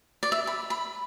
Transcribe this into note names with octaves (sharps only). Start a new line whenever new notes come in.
D5
E5
B5
B5